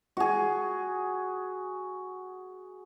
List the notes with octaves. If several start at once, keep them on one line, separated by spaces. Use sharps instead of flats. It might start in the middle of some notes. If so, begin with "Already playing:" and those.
F#4 G#4